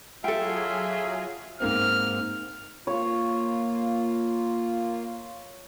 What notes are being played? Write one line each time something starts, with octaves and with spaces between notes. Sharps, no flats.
F#3 F4 G#4 A4 E5 G5
G#2 A#3 C4 F6
A#3 F4 C#5